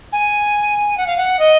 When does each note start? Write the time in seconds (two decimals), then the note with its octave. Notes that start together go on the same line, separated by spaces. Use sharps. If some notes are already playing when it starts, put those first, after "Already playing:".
0.13 G#5
0.98 F#5
1.07 F5
1.17 F#5
1.39 D#5